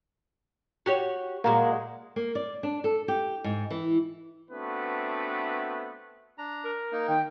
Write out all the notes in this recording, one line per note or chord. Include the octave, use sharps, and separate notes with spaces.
F#4 G4 C#5
A#2 F#3 G#3 A#3
A#3
D5
D4
A4
G4
G#2
E3
A3 B3 C4 D4 F#4 B4
D4 A#5
A#4
A#3 D#4
D#3 G5